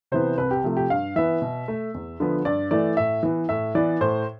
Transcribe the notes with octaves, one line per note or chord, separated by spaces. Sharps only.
C3 E3 B3 C5
C2 B4
G4
C3 F3 A3
G4
G2 F5
E3 B3 E5
B2
A3
E2
D3 F3 B3
G2 D5
E3 A3 D5
A2 E5
E3 B3
A2 E5
E3 B3 D5
A2 C5